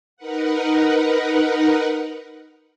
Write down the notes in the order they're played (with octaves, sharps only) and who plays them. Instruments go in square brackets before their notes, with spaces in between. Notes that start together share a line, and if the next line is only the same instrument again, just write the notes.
[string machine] D#4 A#4 B4 F#5